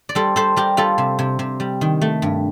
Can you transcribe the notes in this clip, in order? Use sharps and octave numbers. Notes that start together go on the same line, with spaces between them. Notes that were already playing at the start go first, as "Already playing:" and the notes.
D5
G3 A4 C5
G3 A4 C5
G3 G4 A#4
G3 F4 A4
C3
C3
C3
G3
D#3
A3
G2